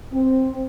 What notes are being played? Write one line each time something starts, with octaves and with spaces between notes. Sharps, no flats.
C4